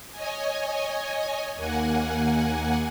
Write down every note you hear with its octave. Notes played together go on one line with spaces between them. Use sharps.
C#5 D#5 G#5
D#2 A#3 F#5 G#5